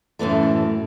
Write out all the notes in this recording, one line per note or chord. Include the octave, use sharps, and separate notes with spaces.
F#2 A2 E3 A3